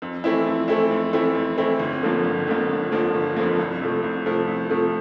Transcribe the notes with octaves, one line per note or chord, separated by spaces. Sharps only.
F2
E3 A3 C4 E4
F2
E3 A3 C4 E4
F2
E3 A3 C4 E4
F2
E3 A3 C4 E4
G1
F2 D3 F3 A#3
G1
F2 D3 F3 A#3
G1
F2 D3 F3 A#3
G1
F2 D3 F3 A#3
C2
C3 F3 A3
C2
C3 F3 A3
C2
C3 F3 A3